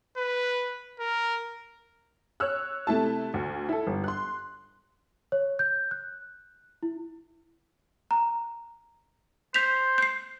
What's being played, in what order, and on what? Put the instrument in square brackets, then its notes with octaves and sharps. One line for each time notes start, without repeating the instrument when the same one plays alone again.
[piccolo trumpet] B4
A#4
[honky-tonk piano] C#5 E6 F#6
C3 A3 E4 A5
D2
E4 A4
G1
C6 F#6
[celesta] C#5
G6
F#6
E4
[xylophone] A#5
[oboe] C5 [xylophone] G6 B6 F7
[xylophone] G6 C7